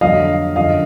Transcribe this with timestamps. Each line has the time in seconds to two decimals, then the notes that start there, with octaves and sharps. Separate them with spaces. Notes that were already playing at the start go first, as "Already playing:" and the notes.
0.01 F2 D3 F#3 D#5 F5
0.56 F#2 D3 F3 D#5 F5